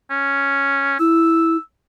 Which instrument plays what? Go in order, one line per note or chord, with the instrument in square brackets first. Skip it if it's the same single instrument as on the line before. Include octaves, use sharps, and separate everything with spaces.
[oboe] C#4
[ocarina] E4 [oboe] E6